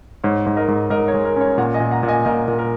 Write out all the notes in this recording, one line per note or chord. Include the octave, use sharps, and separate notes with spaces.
G#2 C#5
G#2
A#4 D#5
G#2
G#2 A#4 D#5
C#5
G#3
A#4
C#4 C#5
A#2 C#5 F#5
D#5 G#5
A#2
F#5 A#5
A#2
D#5 G#5
A#2 A#4 D#5
A#2
A#4